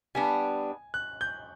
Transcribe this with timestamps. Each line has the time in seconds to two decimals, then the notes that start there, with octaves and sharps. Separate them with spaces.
0.15 G3 B3 D4 G#5
0.94 F#6
1.21 G6